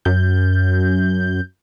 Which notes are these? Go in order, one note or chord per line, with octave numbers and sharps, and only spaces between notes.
F#2 G6